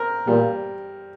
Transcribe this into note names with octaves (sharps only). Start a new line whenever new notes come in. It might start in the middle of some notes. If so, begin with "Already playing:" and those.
Already playing: C4 A#4
A#2 G3